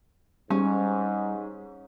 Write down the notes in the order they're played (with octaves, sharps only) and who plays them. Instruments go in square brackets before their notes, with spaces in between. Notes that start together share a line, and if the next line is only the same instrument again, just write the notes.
[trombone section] G#2 [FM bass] G3 [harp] C#4